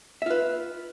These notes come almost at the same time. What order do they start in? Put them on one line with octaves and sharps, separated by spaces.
E5 F4 B4